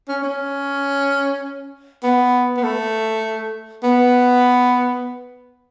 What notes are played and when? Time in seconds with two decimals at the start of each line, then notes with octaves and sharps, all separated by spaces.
0.08 C#4
0.23 C#4
2.03 B3
2.57 B3
2.63 A3
3.83 B3